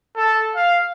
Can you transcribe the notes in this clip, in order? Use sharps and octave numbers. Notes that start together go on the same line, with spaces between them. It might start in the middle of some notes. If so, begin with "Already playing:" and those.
A4
F5